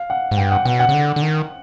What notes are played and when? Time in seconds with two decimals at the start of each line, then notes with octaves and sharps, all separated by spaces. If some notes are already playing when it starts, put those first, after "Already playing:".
Already playing: F5
0.10 F#5
0.31 G#2
0.37 G2 G5
0.52 F#5
0.65 B2 F#5
0.80 F#5
0.89 C#3
0.94 D3
1.16 D3
1.22 D#3